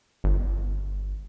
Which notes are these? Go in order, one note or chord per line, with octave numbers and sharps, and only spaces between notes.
G1